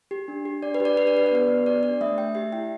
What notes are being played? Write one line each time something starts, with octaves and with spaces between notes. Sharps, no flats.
G4
D4
G4
D4 D5
B4
G4
D5
D4 B4
D5
G4 B4
D5
B3 B4
B3
G4 D5
D4 D5
A3 E5
A3 G5
G4 E5
E4 G5